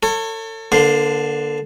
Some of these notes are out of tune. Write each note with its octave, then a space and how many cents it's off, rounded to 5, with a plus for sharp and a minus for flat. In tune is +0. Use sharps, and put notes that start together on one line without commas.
A4 +35 C#5 -10
D3 +0 A#3 +30 C5 +0